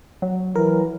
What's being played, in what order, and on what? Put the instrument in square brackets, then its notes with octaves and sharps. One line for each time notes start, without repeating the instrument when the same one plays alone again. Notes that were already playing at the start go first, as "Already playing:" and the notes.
[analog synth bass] F#3
[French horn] E3 [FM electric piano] A#4